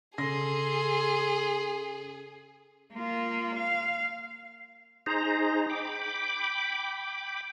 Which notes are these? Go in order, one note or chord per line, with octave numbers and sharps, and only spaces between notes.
C#3 G#4 A4 C6 A#6
A#3 F4
F5
D#4 G#4 C5 A#5
G5 B5 D6